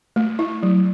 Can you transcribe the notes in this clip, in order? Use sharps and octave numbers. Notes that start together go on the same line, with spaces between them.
A3
E4
F#3